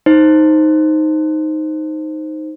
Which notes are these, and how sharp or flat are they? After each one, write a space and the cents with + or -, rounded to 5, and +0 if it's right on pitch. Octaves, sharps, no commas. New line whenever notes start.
D#4 +0 C5 +0